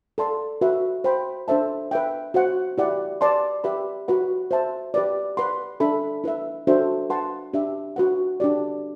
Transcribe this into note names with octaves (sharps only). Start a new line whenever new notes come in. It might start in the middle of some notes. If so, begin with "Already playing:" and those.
A4 D5 A5 C6
F#4 B4 E5
C5 G5 B5
D4 A4 C5 E5 A5
B4 E5 G5
F#4 C5 F#5
E4 G4 D5 F#5
B4 D5 A5 C6
G4 B4 E5 B5
F#4 B4 F#5
C5 E5 A5
G4 B4 D5
B4 F#5 C6
D4 A4 E5 B5
E4 B4 E5
D4 F#4 A4 C5 E5
B4 F#5 A5 C6
D4 G4 B4 E5
F#4 B4 F#5
D4 G4 D5